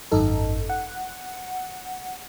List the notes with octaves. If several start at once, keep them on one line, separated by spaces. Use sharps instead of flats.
G#1 F#2 D#4 A4
F#5